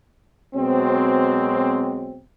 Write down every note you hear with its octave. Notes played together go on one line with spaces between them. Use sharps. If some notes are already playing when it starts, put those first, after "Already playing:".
B2 F#3 G#3 C4